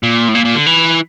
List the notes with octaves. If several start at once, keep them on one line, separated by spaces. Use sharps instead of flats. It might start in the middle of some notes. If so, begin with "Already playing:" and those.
A#2
A2
A#2
A#2
D3
E3